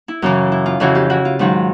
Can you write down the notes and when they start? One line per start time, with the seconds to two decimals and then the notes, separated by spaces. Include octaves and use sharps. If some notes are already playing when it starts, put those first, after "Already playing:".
0.08 E4
0.22 F#2 C#3 E3
0.52 E4
0.66 F4
0.80 F2 C#3 E3 E4 F#4
0.95 F4 G4
1.10 E4 F#4
1.25 F4
1.39 G#2 D#3 F#3